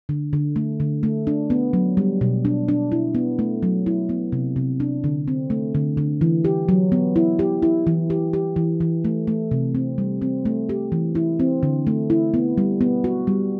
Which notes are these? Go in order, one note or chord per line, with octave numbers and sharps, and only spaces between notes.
D3
D3
A3
D3
A3
D4
B3
F#3
G3
B2
D4
D4
E4
B3
A3
F#3
E4
B3
C3
C3
D4
D3
C4
A3
D3
D3
E3
G4
F#3
B3
E4
G4
E4
E3
G4
G4
E3
E3
A3
A3
C3
C4
G3
C4
A3
G4
E3
E4
C4
D3
A3
E4
B3
G3
B3
F#4
G3